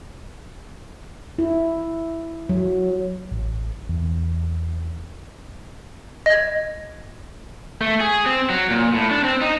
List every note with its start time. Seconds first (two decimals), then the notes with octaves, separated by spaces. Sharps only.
1.39 E4
2.49 F#3
3.31 A1
3.89 E2
6.26 D#5 G#6
7.81 A3
8.00 G#4
8.26 C4
8.50 F#3
8.70 A#2
8.94 A2
9.11 D4
9.24 C4
9.41 D#4